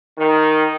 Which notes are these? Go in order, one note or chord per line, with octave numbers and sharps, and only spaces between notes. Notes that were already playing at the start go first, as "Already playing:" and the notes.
D#3